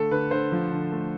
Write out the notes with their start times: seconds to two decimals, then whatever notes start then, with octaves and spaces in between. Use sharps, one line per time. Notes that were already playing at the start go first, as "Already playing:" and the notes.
Already playing: D3 A3 A4
0.11 D3 B4
0.31 D3 C5
0.52 F3
0.72 D3
0.92 A3